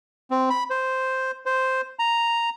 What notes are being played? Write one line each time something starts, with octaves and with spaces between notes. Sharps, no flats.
C4
B5
C5
C5
A#5